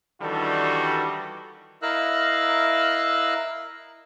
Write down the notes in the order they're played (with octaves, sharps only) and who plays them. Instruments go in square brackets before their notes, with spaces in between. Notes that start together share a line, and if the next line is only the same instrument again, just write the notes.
[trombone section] D#3 E3 G3 D4 F#4 A4
[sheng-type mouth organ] E4 A#4 D#5 F5 E6 F#6